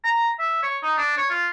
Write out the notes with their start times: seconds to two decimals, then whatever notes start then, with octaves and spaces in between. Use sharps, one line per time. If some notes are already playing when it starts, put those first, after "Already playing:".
0.04 A#5
0.39 E5
0.62 C#5
0.83 D#4
0.97 D4
1.17 C#5
1.30 F4